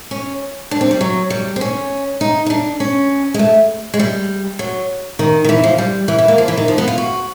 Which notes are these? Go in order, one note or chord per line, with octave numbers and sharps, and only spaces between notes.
C#4
D4
C4
G3
F#3
G3
C4
C#4
D#4
D#4
D4
C#4
G#3
A3
G#3
G3
F#3
D#3
D#3
E3
F3
G3
E3
E3
A#3
F3
E3
D#3
F3
B3
F4
F#4